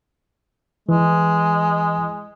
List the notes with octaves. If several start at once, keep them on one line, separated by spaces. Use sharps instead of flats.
E3 G#3